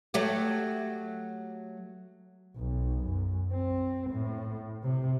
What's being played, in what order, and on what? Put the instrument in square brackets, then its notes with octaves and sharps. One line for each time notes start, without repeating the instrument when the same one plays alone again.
[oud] F#3 A3 G4
[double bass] B1
F#2
C4
A2
C3